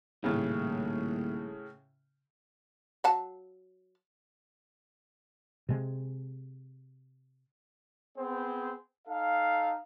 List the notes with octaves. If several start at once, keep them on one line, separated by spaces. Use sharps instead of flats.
D#1 A2 C#3 A3
F#3 F#5 A5
C3 G#3
B3 C4 G#4 C5
D#4 A4 F5